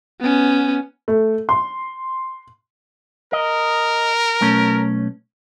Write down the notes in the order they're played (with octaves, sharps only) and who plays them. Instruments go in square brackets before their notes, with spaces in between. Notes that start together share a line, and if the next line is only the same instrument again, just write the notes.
[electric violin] B3 C#4
[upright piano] A3
C6
[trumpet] A#4 [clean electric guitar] D#5
[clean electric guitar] B1 A3 C#4